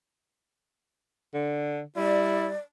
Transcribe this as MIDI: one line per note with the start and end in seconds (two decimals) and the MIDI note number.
1.34 1.82 50
1.96 2.54 55
1.96 2.49 64
1.96 2.58 74